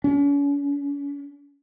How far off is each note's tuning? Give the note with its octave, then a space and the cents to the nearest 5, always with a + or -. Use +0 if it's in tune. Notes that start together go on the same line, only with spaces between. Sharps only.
C#4 +40